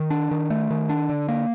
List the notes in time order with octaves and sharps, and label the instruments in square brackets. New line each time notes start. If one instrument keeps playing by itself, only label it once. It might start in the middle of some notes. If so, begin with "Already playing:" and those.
Already playing: [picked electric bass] D#3
D4
D#3
A3
D#3
D4
D3
A#3